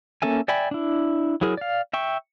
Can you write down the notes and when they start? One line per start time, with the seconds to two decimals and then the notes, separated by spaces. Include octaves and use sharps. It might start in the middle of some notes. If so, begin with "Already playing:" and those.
0.22 A#3 C#4 A4 E5 G#5
0.48 D5 E5 G5 G#5 B5
0.71 D4 E4
1.41 F#3 E4 G#4 A#4
1.57 D5 F5
1.93 E5 G5 C#6